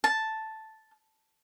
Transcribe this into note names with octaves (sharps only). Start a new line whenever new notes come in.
A5